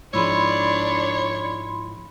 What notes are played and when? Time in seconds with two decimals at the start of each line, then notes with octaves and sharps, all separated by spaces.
0.14 G#2 F3 G#3 D4 E4 C#5 B5 C6